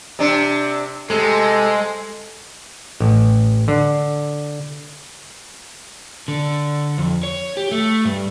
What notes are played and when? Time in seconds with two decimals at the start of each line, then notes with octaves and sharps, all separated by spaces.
0.19 C3 D4
1.10 C3 G#3 A4
3.00 A1
3.68 D3
6.28 D3
6.98 F2
7.23 C#5
7.57 G4
7.71 A3
8.05 G2